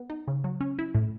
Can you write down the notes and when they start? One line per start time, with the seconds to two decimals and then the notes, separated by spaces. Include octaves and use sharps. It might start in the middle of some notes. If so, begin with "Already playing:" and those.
Already playing: B3
0.10 D#4
0.28 C#3
0.44 F#3
0.61 C#4
0.79 E4
0.95 A2